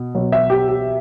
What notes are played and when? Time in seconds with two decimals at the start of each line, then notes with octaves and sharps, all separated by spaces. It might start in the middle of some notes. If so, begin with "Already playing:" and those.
Already playing: B2
0.15 B2 F#3
0.32 E5
0.50 G4
0.68 G4